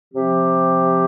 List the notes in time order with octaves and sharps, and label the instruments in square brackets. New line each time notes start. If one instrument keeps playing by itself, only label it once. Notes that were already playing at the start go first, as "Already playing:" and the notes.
[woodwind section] C3 F3 C4 G4